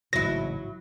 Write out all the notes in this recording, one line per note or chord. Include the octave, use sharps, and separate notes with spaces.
A1 G#2 C#3 F#3 E4 A#6